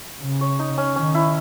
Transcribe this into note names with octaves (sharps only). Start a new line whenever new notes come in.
C#3
C#5
D#4
C#4
D#3 C#4
E4